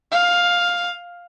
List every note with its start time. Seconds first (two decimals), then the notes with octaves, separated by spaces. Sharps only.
0.12 F5